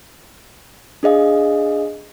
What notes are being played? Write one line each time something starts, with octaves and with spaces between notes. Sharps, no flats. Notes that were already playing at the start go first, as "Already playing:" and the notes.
D4 G#4 D#5 F5